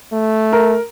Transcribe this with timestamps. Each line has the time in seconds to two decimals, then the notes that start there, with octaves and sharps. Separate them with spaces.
0.12 A3
0.53 A#4